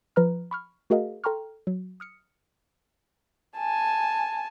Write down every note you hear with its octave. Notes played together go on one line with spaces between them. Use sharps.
F3 B4 A#5 F6
B5 C#6 F6
A3 F#4 G#4 A#4 D#5 F5
A4 G5 A#5 C6 C#6 F6
F#3
D#6 F6 C#7
G#5 A5